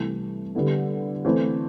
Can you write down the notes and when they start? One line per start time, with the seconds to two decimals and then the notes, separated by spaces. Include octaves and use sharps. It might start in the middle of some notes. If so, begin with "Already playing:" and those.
Already playing: C2 C3 E3 A3
0.55 D3 G3 B3 E4
1.25 E3 A3 C4 E4